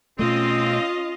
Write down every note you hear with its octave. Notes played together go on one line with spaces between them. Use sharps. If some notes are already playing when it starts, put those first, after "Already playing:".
B2 A3 C4 C#4 F4 D#5 F5